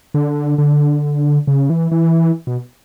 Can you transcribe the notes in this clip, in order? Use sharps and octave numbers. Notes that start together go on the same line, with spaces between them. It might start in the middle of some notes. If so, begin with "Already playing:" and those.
D3
D3
C#3
E3
E3
B2